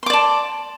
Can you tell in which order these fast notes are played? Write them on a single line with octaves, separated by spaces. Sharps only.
C6 D6 D5 A5